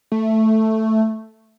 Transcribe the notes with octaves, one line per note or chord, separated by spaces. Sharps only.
A3